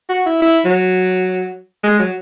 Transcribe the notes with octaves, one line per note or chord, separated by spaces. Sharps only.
F#4
E4
E4
F#3
G#3
F#3